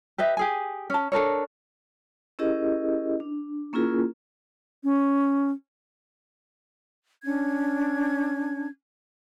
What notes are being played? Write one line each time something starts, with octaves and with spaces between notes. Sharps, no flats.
G4 B4 D#5 E5
G4 G#4 G#5
C#4 A5
D4 A4 A#4 C#5
C#4 E4 G4 G#4 A#4 D#5
D4
A#3 C#4 E4 F4 G#4 A#4
C#4
C#4 D4 G#6